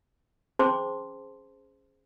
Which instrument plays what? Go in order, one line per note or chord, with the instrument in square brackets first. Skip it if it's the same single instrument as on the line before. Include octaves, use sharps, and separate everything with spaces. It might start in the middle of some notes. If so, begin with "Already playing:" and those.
[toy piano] C#4 G#4 C5 A5 C6 D6